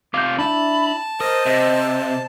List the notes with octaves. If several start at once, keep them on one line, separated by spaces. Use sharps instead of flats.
C3 F4 D6 G6
D4 E4 E5 A5 B5
A#4 C5 D#5
C3 D#5